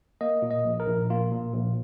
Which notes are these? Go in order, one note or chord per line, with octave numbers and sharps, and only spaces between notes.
A#3 D#5
A#2
D#5
A#1
A#4
A#1
A#3 F4
A#2
A#1